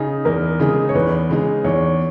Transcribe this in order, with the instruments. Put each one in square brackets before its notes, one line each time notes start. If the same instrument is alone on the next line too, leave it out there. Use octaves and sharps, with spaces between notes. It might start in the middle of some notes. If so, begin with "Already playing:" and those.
Already playing: [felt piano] C#3 D#4 [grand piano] G#4
[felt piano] E2 [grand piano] A#4
[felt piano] C#3 G#3 D#4 G#4
[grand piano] C#5
[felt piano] E2 [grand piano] B4
[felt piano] C#3 G#3 D#4 G#4
[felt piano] E2 [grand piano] C#5